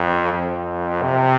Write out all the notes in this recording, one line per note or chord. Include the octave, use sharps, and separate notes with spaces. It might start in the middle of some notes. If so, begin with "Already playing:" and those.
Already playing: F2
F2
C3